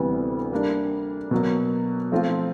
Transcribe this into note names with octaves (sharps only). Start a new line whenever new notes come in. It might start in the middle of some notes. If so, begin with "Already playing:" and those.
Already playing: D2 C3 E3 G3 B3
G3 A#3 D4
B2 F#3 A#3
F3 A3 C4 F4